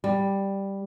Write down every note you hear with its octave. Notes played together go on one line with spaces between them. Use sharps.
G3